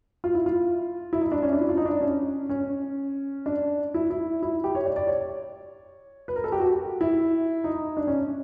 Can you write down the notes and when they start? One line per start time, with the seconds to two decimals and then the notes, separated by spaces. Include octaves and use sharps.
0.24 F4
0.35 E4
0.46 F4
1.13 E4
1.21 D#4
1.32 D4
1.42 C#4
1.53 D4
1.61 E4
1.69 F4
1.77 D#4
1.85 D4
2.01 C#4
2.49 C#4
3.46 D4
3.94 E4
4.10 E4
4.43 E4
4.64 G4
4.75 C#5
4.85 D5
4.96 D5
5.07 C#5
6.28 B4
6.36 A#4
6.44 A4
6.52 G4
6.60 F#4
7.01 E4
7.64 D#4
7.97 D4
8.07 C#4